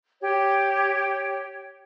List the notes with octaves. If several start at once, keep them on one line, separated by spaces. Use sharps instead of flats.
G4 C#5